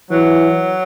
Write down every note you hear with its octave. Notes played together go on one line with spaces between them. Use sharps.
E3 F#3